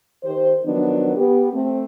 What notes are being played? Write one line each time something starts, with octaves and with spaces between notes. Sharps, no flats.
D#3 G4 C5
D#3 F3 F#3 B3 D4
B3 G4
A3 C4